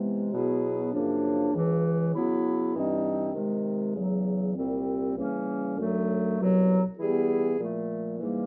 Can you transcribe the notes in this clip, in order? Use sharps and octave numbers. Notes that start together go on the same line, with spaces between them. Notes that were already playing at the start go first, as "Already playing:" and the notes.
Already playing: C3 E3 G#3 B3
B2 F#3 B3 E4 G#4
F#2 C#3 F3 A#3 D4
C#2 C#3 E3
C#3 F#3 B3 E4
G2 E3 G3 C4 D#4
C3 D#3 G#3
E2 C#3 F#3
C2 A#2 G3 C4
C#3 E3 G3 A#3 C#4
F#2 D3 F#3 A3
C2 B2 F#3
E3 G3 B3 E4 G#4
A#2 F3 A3
G#2 E3 G3 A#3